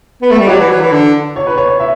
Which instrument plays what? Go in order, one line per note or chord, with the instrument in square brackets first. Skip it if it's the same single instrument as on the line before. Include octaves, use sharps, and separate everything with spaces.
[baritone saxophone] B3
A3
G3
[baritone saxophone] F#3 [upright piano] D5
[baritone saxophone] E3
F#3
E3
D3
[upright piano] C#5
B4
C#5
C#5
E5